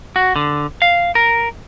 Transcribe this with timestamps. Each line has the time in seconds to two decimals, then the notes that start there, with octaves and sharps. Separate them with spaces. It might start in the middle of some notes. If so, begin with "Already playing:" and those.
0.16 F#4
0.36 D3
0.82 F5
1.15 A#4